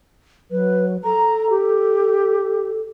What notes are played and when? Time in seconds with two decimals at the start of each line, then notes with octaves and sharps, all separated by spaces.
0.51 F#3 B4
1.04 A4 A#5
1.50 G4